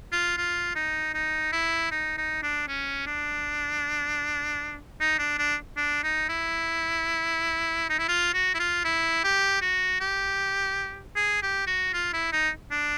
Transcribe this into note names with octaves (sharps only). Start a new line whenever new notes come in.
F4
F4
D#4
D#4
E4
D#4
D#4
D4
C#4
D4
D#4
D4
D4
D4
D#4
E4
D#4
E4
F4
F#4
E4
F4
E4
G4
F#4
G4
G#4
G4
F#4
F4
E4
D#4
D4